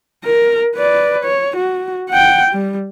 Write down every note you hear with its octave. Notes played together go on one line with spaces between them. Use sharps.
A#4
B4 D5
C#5
F#4
F#5 G5
G3